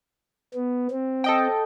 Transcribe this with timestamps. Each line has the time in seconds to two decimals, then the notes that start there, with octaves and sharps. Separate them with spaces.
0.54 B3
0.91 C4
1.24 A4 D#5 G5